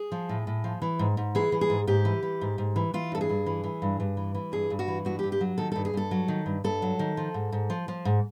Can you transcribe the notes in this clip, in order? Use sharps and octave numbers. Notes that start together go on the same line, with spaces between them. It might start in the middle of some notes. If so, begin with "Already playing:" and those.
Already playing: G#4
F3
A2
A2
F3
E3
G#2
G#2
E3 G#4
E3
G#4
G#2
G#2 G4
E3
E3
G#2
G#2
E3
E3 F4
G2 A4
G#4
G2
E3
E3
G2
G2
E3
E3
G2 G#4
G2
F#4
E3
G2 F#4
G4
G2
G4
F#3
D#3 A4
G2 A4
G#4
G2 A4
F#3
D#3
G2
G2 A4
F#3
D#3
F3
G#2
G#2
F3
F3
G#2